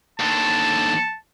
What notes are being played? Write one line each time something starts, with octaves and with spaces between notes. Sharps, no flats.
D#2 D3 A5